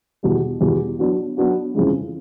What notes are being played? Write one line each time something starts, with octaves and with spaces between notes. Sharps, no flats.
E2 B2 G3
E2 B2 G3
F#3 B3 D4 F#4
F#3 B3 D4 F#4
F2 C#3 E3 G#3